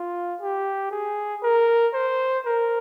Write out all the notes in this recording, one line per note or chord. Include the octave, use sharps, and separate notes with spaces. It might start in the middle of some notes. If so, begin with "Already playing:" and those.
Already playing: F4
G4
G#4
A#4
C5
A#4